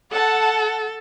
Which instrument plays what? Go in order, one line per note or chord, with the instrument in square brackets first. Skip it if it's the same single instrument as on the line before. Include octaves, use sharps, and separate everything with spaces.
[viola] A4 [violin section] F#5 A5